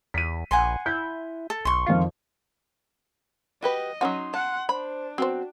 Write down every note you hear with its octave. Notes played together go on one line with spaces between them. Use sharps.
E2 B6 D#7
A#1 F#5 G#5 C6
E4 G6
A4
B1 C6 C#6
F2 D#3 F4 F5
F#4 G4 B4 D#5
F#3 C#4 D#4 F#4 C6
F#5 A5
D4 C5 B5
F#3 B3 C4 F#4 C5